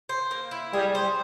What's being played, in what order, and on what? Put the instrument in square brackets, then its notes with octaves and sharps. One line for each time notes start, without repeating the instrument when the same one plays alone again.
[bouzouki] C5
A#3
E4
[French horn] G3 [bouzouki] G#4
[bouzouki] C5